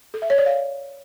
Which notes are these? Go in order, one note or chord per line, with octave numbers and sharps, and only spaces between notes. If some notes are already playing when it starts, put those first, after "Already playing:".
A4
E5
C#5
D5
F5